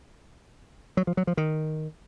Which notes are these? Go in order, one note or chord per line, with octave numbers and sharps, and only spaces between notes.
F#3
F3
F#3
F3
D#3